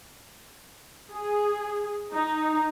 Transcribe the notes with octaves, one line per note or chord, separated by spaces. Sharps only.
G#4
D#4